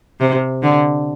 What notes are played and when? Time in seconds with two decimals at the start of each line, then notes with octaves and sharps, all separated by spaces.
0.20 C3
0.63 D3